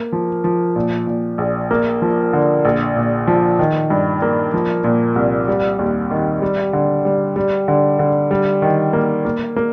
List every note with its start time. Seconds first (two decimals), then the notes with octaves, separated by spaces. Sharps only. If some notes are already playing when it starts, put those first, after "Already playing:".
Already playing: A#3
0.12 F3
0.44 F3
0.76 A#2
1.07 A#2
1.38 A#1
1.71 A#3
2.02 F3
2.33 D3
2.65 A#1
2.96 A#2
3.27 F3
3.59 D#3
3.90 G2
4.22 A#3
4.54 F3
4.84 A#2
5.16 C2
5.48 G3
5.79 D#2
6.11 D#3
6.42 G3
6.73 D3
7.05 G3
7.36 G3
7.68 D3
7.99 D3
8.31 G3
8.62 D#3
8.93 A#3
9.25 A#3
9.56 A#3